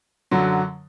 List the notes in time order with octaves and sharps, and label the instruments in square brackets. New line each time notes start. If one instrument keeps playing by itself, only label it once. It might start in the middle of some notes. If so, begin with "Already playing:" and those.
[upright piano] F#2 D3 F#3